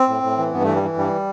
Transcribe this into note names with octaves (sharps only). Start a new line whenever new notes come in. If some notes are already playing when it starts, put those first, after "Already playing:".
Already playing: C4
A2
A2
E3
G2 B3
E3 A3
G3
E3
G2 G3